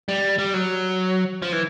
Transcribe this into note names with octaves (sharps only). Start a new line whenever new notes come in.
G3
G3
F#3
F3
E3